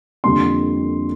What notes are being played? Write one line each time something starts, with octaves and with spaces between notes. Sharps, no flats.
F2 D3 G3 A#3 C6